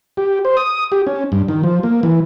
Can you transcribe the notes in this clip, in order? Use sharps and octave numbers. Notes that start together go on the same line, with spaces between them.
G4
C5
D#6
G4
C#4
G2
D#3
F3
A#3
E3